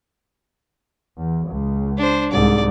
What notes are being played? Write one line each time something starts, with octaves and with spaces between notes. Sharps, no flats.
E2
C#2
D4 C5
C2 G#2 D5